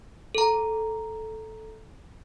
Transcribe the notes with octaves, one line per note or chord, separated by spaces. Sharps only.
A4 A#5